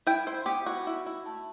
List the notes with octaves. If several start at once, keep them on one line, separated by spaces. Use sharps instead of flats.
E4 G5
E4 C5
B3 G4
E4 F#4
E4
E4
A3